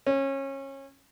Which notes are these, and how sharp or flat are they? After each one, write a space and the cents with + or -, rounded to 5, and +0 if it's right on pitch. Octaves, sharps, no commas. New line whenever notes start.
C#4 -25